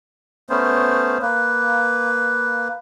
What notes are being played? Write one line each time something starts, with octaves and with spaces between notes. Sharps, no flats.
A3 B3 C#4 C5
A#3 B4